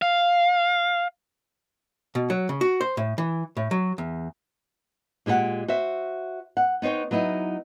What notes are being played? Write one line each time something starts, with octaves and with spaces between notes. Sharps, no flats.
F5
B2
F#3
C#3
F#4
C5
A2
E3
A2
F#3
E2
A#2 G#3 G4 A#4 F#5
F#4 C5 E5
F#5
B3 D#4 C5 C#5 G5
F#3 B3 D#4 E4